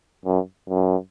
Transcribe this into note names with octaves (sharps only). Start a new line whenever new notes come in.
F#2
F#2